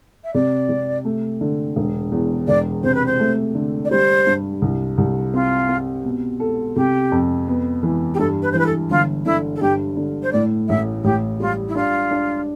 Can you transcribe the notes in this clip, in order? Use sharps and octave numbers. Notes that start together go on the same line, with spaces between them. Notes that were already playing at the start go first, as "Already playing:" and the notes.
E5
C3 D5
C3
A3
D3
E1
E2
E1 D5
C3 C5
B4
C5
A3
D3
D5
G3 C5
G2
C2
C2
C4 F4
C4
B2
A4
C3 G4
F2
B3
E3
G4
G2 A4
B4
E3 C5
B4
A4
G1 F4
D3 E4
A4
G2 G4
D3
C5
A2 D5
A1 E5
A1 G4
G3 F4
E4
D4 F4
D4